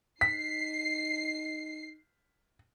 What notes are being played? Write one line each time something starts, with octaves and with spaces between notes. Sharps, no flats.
D#4 B6 C7